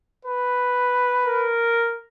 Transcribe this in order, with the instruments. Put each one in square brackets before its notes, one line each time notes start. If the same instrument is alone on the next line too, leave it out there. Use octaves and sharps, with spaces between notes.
[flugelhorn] B4
[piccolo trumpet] A#4